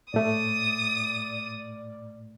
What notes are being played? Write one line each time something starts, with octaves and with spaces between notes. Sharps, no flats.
A2 A3 D5 D#6